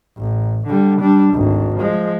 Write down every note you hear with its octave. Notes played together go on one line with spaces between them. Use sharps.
A1
D3 G3
G3 D4
G#1 D2
F3 G#3